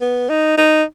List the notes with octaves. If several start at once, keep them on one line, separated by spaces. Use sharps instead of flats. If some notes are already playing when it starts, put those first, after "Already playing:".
B3
D#4
D#4